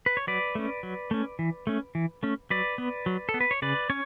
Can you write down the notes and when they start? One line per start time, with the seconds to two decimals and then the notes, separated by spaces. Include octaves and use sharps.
0.06 B4
0.17 C#5
0.27 F#3 B4 D5
0.55 A3 C#4
0.83 F#3
1.11 A3 C#4
1.39 E3
1.67 A3 C#4
1.95 E3
2.23 A3 C#4
2.50 F#3 B4 D5
2.78 B3
3.06 F#3
3.29 A4
3.34 B3
3.41 B4
3.51 C#5
3.62 C#3 B4 D5
3.90 C#4 C#5